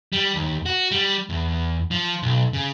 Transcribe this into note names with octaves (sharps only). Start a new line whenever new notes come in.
G3
D#2
F#4
G3
E2
F3
B1
C#3